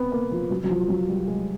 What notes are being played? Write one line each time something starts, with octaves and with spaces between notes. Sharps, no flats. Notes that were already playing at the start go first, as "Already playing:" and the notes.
Already playing: B3 C4
A#3
F3
F#3
F#3
F3
F#3
G3
G#3